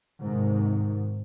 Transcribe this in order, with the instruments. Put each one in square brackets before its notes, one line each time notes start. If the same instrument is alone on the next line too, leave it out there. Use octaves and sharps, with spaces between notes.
[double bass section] G#2 C3 D#3